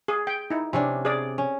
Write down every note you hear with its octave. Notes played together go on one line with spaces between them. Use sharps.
G#4
G5
D#4 E4
C3 C#4 D4
G#4 D5
C#4